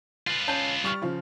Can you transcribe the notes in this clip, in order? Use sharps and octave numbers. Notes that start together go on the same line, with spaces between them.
F4 B4 A6
C#4 A5 G6
G3 C#6 F6
C#3 F3